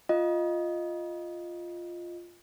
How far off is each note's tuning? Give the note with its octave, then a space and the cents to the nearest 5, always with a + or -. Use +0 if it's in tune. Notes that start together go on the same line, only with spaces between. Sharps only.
F4 +0 D#5 +0